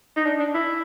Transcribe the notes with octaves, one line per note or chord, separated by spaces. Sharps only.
D#4
D4
D4
E4